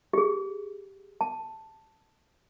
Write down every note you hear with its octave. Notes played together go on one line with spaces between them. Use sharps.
G4 G#4
A5